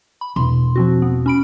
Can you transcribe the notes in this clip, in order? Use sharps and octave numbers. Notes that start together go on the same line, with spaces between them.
B5
E1 C6
F3 C4 F#4
B3
C#4 B5 D7